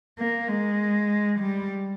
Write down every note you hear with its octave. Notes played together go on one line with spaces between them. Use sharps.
A#3
G#3
G3